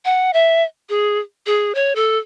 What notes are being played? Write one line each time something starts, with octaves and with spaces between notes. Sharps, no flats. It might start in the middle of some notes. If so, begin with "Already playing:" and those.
F#5
E5
G#4
G#4
C#5
A4